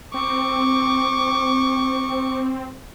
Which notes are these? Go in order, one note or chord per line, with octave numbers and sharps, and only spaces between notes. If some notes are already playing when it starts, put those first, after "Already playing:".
C4 C#6 D6